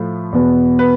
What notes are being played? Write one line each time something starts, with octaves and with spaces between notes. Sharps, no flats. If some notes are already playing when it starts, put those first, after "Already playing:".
Already playing: A2 F3 A3
E2 B2 B3
B4